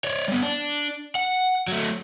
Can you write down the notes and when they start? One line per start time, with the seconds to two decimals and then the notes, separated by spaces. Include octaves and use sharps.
0.04 C#5 D5
0.28 G3 B3
0.42 D4
1.15 F#5
1.68 F#3 A3